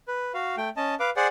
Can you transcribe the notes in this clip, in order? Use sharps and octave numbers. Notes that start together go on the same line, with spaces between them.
B4
F#4 F5
A3 G5
C#4 D#5 A5
B4 F5 D6
G#4 C5 D5 F#5